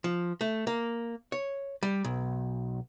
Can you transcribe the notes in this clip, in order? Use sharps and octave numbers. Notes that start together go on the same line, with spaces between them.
F3
A3
A#3
C#5
G3
B1